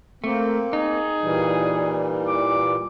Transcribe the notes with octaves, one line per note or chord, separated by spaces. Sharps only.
A3 A#3 C4
D#4 G#4
A#2 E3 G3
D6